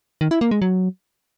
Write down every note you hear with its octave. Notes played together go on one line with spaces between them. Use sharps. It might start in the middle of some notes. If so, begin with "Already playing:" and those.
D#3
E4
A#3
G#3
F#3